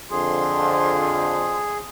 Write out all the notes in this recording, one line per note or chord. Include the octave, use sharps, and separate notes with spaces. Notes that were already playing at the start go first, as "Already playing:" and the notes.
F2 D3 G#4 C6